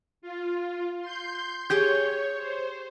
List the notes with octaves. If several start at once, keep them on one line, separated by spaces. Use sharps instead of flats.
F4
C6 G6
G4 G#4 C#5 C6 G6
C5